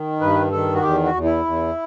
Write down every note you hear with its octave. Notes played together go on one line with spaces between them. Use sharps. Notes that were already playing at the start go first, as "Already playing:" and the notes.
Already playing: D#3
G2 B4
D#3 A4
F#4
E2 G4
F#4
E2
E4
E2